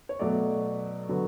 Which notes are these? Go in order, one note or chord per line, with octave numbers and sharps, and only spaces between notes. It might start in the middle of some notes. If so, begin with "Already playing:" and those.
C#5
B2 F#3 A3 D5
D3 F#3 B3